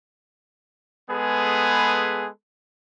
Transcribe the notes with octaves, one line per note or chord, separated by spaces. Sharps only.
G#3 B3 G#4 A4 B4